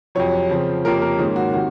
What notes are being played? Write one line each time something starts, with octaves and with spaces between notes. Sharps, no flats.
F2 C3 F#3 C#5
C#3 F3 C4
F2 C3 F3 A#3 C#4 A#4
A#4
G#2 D#3 A#3 C#4 G#4
F#4
C3 D#3 F#4